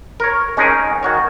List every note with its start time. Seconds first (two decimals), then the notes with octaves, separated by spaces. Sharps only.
0.20 A#4 C#5
0.57 G#3 C#4 D#4 G#4 A#4
1.03 D#3 F#4 C#5